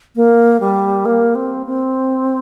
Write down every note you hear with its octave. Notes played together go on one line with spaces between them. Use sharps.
A#3
G3
A#3
C4
C4